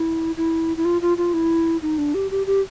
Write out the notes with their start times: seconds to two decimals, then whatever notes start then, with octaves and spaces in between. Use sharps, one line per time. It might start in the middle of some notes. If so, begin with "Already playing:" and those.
Already playing: E4
0.37 E4
0.77 E4
0.85 F4
1.02 F4
1.18 F4
1.34 E4
1.82 D#4
1.98 D4
2.14 G4
2.31 G4
2.47 G4